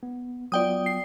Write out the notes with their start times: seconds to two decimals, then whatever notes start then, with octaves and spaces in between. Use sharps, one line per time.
0.03 B3
0.52 F#3 B3 F4 D5 G5 D#6
0.86 C7